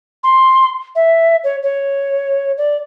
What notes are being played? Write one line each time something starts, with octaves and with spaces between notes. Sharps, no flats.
C6
E5
C#5
C#5
D5